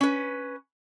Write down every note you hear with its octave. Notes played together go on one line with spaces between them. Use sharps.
C#4 B4